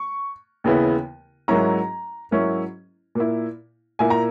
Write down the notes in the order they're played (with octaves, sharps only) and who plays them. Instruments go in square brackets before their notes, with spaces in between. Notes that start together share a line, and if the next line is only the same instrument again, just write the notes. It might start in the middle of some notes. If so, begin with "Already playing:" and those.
Already playing: [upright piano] C#6
D#2 C#3 E3 B3 E4
G#2 F#3 A#3 C#4 E4 A#5
G#2 F#3 A#3 C#4 E4
A#2 A#3 E4
A#2 A#3 E4 G#5
A#5